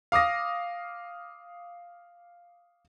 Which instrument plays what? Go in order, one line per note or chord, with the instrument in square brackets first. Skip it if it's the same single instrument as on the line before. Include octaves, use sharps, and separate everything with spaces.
[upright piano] F5 D6 D#6 A#6